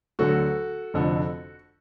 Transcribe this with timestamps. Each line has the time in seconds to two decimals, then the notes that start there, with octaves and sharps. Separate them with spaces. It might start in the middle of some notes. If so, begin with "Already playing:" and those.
0.19 D2 D3 F#3 F#4 A4
0.94 F1 F2 D3